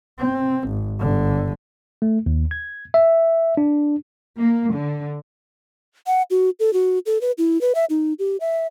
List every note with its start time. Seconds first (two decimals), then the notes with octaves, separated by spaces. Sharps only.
0.19 C4
0.68 G#1
0.99 G1 D3
2.02 A3
2.26 D#2
2.51 G#6
2.94 E5
3.57 D4
4.39 A#3
4.73 D3
6.07 F#5
6.30 F#4
6.60 A4
6.73 F#4
7.06 A4
7.21 B4
7.38 E4
7.61 B4
7.75 E5
7.90 D#4
8.19 G4
8.41 E5